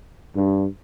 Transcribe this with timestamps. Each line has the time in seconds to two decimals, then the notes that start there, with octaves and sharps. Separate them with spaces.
0.36 G2